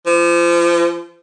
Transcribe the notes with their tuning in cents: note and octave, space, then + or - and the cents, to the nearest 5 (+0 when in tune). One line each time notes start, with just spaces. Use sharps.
F3 -30